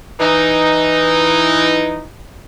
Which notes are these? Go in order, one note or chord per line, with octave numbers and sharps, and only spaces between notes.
E3 D#4